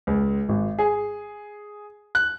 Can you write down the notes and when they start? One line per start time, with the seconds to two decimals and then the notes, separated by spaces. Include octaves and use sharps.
0.07 C#2
0.49 G#1
0.79 G#4
2.15 F#6